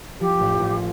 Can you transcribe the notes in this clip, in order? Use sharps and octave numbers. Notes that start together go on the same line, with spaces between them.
F3 G4
A1
A1